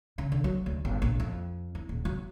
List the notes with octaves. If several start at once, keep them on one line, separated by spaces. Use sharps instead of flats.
C#3
D3
F#3
D2
G1
A#1
F2
E4
D#1
F#3